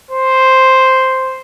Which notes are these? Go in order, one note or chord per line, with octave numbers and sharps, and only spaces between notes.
C5